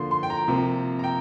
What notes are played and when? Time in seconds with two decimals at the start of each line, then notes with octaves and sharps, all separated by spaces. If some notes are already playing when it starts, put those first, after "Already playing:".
Already playing: D3 F3 A#3 C6
0.11 C6
0.23 G5
0.30 A#5
0.48 C3 F3 A#3
0.99 A#5
1.04 G5